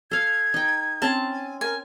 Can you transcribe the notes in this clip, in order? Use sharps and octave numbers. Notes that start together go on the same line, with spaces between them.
A4 F5 G#6
D#4 G5
C4 C#4 A5
G#5
A#4 G#5